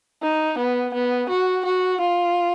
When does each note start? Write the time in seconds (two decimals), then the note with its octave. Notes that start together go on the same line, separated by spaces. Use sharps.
0.23 D#4
0.58 B3
0.94 B3
1.29 F#4
1.65 F#4
2.01 F4